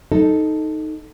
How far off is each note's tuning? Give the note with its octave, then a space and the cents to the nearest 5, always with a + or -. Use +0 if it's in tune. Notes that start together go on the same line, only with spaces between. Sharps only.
D#4 +0 A4 +0 D#5 +0